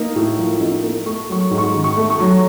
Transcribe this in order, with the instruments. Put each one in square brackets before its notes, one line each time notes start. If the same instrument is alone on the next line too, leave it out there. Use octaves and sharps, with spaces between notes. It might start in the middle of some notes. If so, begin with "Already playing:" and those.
Already playing: [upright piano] A#3 D#4
A2
F3
D#4
A#3
A3 C#6
F#3 C#6
G#2
C#6
D#3
C#6
A3
C#6
F#3